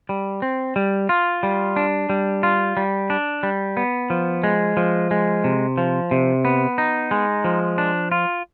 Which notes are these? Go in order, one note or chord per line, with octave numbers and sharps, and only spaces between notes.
G3
C4
G3
F4
G3
D4
G3
F4
G3
D4
G3
B3
F3
G#3
F3
G#3
C3
F3
C3
B3
D#4
G#3
F3
D4
F4